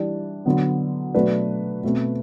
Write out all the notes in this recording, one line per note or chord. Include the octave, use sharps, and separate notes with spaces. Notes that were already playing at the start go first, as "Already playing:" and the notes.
Already playing: E3 G3 D4
D3 F#3 B3
B2 F#3 A3 D4 B4
B2 A3 C4